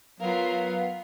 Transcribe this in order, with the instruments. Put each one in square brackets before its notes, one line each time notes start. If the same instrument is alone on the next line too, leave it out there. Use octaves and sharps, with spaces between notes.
[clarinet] F#3 [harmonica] B3 [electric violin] F4 A#4 [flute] F5